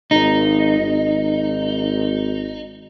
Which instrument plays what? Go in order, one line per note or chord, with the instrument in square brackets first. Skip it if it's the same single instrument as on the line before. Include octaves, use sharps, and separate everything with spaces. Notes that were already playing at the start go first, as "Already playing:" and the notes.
[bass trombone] G#1 [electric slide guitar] D#4
[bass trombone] G#1